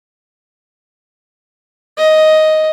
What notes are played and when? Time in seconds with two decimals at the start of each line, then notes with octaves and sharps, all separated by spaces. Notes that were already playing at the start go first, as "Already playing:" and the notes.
1.97 D#5